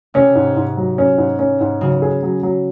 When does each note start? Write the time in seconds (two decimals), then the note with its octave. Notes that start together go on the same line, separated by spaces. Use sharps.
0.14 C3 C#4
0.35 G#2
0.57 G#2
0.77 F#3
0.98 C#4
1.18 G#2
1.39 C#4
1.61 G#2
1.81 C#3 F#3
2.02 G#4
2.23 F#3
2.43 F#3